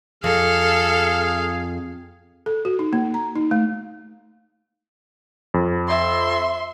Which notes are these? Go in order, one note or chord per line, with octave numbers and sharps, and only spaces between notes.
F2 G#4 A4 F5
A4
F#4
D#4
A#3
A#5
D#4
A3
F2
E5 C6